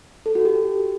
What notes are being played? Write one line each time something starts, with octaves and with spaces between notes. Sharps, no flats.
A4
F#4
G4